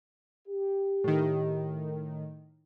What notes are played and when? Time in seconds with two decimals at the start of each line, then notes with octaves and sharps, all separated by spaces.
0.48 G4
1.04 A2 D#3